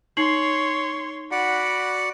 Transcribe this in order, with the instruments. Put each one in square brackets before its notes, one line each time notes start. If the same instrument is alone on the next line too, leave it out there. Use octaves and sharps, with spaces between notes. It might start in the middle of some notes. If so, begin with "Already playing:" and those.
[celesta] D#4 C7 F#7 [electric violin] C#5 C6
[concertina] F#4 D5 F#5 [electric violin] B5